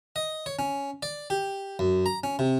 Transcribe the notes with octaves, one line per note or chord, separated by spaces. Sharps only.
D#5
C#5
C#4
D5
G4
F#2
A#5
C#4
C3